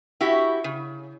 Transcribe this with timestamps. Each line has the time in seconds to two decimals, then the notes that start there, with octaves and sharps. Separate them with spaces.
0.21 E4 F#4 G4
0.64 C#3